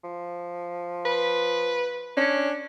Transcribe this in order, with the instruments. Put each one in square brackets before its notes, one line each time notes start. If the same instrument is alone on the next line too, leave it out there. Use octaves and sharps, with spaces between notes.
[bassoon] F3
[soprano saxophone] B4
[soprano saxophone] C#4 [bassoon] D4